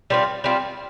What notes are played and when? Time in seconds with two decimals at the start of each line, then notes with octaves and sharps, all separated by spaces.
0.10 G3 C4 F4
0.44 G3 C4 F4